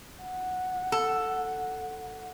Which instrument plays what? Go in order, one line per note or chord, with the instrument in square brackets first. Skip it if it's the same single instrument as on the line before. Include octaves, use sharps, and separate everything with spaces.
[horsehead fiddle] F#5
[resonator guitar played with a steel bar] A4